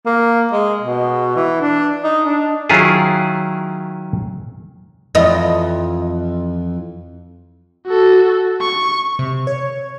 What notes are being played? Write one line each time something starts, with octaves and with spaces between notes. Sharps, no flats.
A#3
G#3
B2
E3
D4
D#4
D4
D#3 F#3 C#4 E4 F4 G#4
F2 E3 D#5
F#4 A4
C#6
C3
C#5